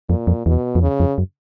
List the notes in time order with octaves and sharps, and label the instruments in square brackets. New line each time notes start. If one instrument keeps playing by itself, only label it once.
[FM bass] F2 [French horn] A#2
[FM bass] F2
[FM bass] E2 [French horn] B2
[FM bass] F2
[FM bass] E2 [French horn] C#3
[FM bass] F2
F#2